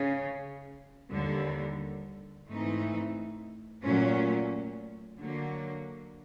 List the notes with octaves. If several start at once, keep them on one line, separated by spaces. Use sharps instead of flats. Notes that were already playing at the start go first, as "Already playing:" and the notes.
Already playing: C#3
D#2 D3 G3
G#2 E3 A3 C4 D#4
A#2 F#3 A3 C#4
D3 F#3 A#3